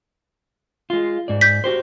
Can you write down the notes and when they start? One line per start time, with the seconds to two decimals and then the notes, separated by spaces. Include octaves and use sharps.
0.90 G#3 F4
1.28 G#2 D5
1.41 G6 B6
1.64 F#4 G4 C5